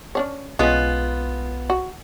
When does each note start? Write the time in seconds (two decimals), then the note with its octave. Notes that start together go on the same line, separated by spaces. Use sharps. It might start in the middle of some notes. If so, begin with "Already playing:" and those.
0.15 C#4 D4 C#5
0.59 B1 G#3 B3 C#4 F4
1.70 F#4